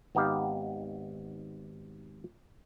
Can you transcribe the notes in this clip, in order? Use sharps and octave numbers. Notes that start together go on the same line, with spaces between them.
G#1 B3 D#4 G4 F5